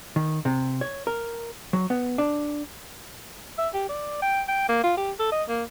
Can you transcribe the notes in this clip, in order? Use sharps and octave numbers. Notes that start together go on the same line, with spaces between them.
D#3
C3
C#5
A#4
F#3
B3
D4
E5
G4
D5
G5
G5
A#3
F4
G4
A4
D#5
A#3